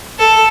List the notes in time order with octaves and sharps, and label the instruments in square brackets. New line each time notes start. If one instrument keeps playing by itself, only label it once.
[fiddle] A4